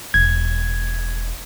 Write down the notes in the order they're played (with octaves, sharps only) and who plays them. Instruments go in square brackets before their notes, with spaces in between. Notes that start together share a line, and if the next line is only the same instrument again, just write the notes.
[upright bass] E1 [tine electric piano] G#6